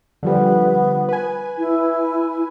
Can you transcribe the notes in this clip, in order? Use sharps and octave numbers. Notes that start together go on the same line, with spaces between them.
D3 F3 G3 B3
B4 G#5
E4